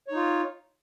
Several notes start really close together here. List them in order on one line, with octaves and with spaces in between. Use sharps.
C#5 D#4 F4